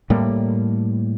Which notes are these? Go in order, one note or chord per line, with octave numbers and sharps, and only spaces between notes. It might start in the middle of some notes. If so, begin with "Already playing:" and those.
A2 G3 A#3